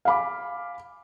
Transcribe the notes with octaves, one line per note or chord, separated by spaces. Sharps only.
F5 G#5 B5 D6